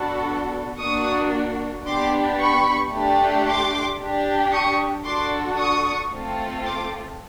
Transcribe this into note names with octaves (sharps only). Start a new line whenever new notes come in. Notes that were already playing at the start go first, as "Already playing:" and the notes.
Already playing: B3 D4 F#4 A4
A#3 D4 F#4 C#6 D#6
B3 D4 G4 C6 D6
B5 C#6
A3 D4 G4
C6 D6
D4 G4
C#6 D#6
D4 F#4 A4 C6 D6
C#6 D#6
A3 C4 F4 A4
C6 D6